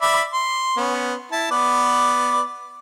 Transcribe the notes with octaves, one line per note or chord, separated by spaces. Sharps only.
D5 E5 B5
C6
B3 C#4
E4 A5
B3 B4 D5